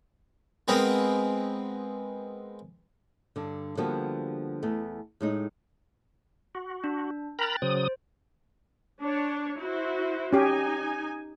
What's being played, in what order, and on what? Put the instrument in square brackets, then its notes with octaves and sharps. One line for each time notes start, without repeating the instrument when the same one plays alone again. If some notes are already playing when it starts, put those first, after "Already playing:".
[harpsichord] G#3 B3 C4 A#4
[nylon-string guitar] G2 D3
D3 F3 G3 A#3 B3 F#4
E2 A3 B3
A2 G#3 D#4
[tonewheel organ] F#4
[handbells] D4
[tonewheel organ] A#4 A#5 B5 [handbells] G5 F#6 A6
[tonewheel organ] C#3 F#3 D#6 [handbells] C5
[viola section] D4 C#5
E4 F#4 C5
[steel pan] C#4 G4 [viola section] D#4 G#5